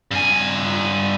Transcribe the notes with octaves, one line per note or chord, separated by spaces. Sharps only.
G2 G#5